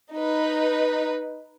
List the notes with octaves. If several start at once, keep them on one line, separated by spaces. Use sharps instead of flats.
D#4 B4